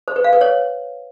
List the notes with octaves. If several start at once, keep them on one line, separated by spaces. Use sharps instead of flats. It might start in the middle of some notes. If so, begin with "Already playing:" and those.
C5
B4
F5
B4
C#5